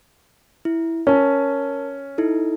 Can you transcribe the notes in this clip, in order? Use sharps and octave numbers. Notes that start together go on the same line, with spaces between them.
E4
C#4 A#4 A5
D#4 E4 A4